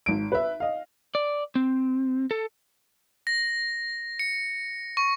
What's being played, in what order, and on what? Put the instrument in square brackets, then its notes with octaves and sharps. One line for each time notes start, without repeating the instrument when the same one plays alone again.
[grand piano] G#1 D7
B4 E5
D#5 F5
[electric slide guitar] D5
C4
A4
[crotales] A#6
C#7
C#6